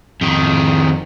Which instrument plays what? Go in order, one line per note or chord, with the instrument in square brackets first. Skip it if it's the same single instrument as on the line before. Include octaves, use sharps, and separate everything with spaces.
[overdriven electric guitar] F2 D#3